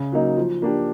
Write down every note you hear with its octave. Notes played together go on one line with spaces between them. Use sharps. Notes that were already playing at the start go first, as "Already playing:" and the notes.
Already playing: C#3
F#3 A#3 D#4
F3
A#3 D4 G4